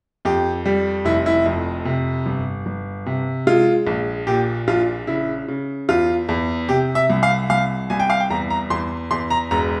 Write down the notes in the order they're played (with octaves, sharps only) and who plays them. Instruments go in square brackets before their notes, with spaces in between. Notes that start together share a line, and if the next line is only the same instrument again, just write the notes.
[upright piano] F2 G4
G3
F1 E4
E4
F2
C3
G1
G1
C3
G#3 F4
A#1
A#2 G4
A#1 F4
C#3 E4
C#3
E2 F4
E2
C3 G4
E5
C2
F5
C2 F5
C2 G#5
G5
F5
G5
E2 A#5
A#5
E2 C6
E2 C6
A#5
E1 A#5